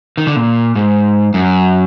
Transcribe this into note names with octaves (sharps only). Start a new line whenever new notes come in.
D#3
D3
A#2
G#2
F#2